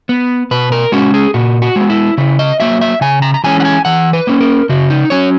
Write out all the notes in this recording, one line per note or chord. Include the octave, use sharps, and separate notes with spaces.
B3
B2 B4
A#4
G#3 C#4 F#4
G#4
A#2 F#4
F#4
G#3 B3
E4
C#3 E4
D#5
F#3 A#3 E5
E5
C#3 G#5
A#5
A#5
E3 G#3 C#4 G#5
F#5
G#5
E3 F#5
B4
A#3 C#4
A#4
C#3 F#4
D#4
F#3 C#4 C#5